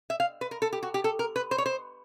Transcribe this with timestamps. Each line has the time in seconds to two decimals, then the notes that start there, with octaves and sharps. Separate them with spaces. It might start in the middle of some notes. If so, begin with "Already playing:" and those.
0.10 E5
0.20 F5
0.41 B4
0.51 A#4
0.62 A4
0.73 G4
0.83 F#4
0.94 G4
1.04 A4
1.19 A#4
1.36 B4
1.51 C5
1.58 C#5
1.66 C5